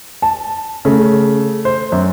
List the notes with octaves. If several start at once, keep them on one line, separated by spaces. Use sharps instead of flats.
A5
C#3 A3
C5
F#2